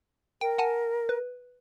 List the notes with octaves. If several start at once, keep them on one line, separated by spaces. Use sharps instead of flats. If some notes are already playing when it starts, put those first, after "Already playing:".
A#4 G5
F#5 G#5 A5
B4